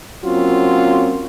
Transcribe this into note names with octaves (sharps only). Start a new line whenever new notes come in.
F#3 A#3 C4 C#4 F4 F#4